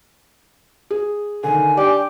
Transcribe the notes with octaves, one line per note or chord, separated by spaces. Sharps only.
G#4
D3 D#3 G#5
D4 G4